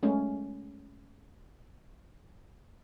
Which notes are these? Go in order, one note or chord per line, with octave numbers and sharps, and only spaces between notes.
G#3 A3 C#4